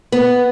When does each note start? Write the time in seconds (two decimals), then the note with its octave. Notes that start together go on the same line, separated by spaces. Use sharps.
0.12 B3